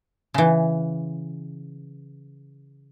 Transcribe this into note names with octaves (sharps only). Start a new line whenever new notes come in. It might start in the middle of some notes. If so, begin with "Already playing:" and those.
C#3 E3